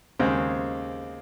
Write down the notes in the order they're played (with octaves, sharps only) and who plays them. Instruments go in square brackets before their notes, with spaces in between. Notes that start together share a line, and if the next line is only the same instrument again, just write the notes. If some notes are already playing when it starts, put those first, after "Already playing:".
[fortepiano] D#2 C#3 G#3 C4